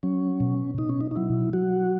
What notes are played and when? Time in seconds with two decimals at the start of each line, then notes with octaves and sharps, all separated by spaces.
0.03 F#3 C#4
0.40 B2
0.78 B2 D#4
0.89 C#4
1.01 D#4
1.11 D#4
1.16 F#3 E4
1.53 F#3 F#4